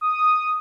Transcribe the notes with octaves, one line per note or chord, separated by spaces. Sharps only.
D#6